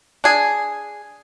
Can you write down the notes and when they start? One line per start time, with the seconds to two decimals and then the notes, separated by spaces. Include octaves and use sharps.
0.24 D4 G#4